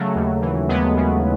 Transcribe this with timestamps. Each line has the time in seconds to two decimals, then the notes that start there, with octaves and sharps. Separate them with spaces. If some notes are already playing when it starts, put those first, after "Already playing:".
Already playing: C#3 F#3 A3
0.15 D#2
0.41 E3
0.69 D#2 G#3 B3
0.97 C#3